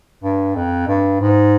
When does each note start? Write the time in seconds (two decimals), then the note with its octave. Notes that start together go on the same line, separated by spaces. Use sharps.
0.24 G2
0.56 F2
0.88 G2
1.21 G#2